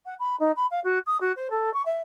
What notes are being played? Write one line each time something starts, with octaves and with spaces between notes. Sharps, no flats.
F#5
B5
D#4
B5
F5
F#4
D#6
F#4
C5
A4
C#6
E5